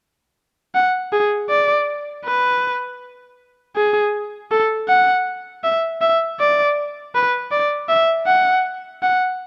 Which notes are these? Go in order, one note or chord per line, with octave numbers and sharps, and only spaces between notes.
F#5
G#4
D5
B4
G#4
A4
F#5
E5
E5
D5
B4
D5
E5
F#5
F#5